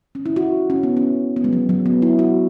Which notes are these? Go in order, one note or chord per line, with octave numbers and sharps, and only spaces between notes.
C#4
E4
F#4
C#4
B3
C#4
B3
G#3
F#3
F#3
B3
E4
F#4